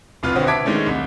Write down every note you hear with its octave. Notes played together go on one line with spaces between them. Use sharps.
F1 C2 F4 B4 F6
B2 D3 B3 C4
E5 A5 D6 G#6 B6 D7
D#3 G#3 A3 C#4 D4
C2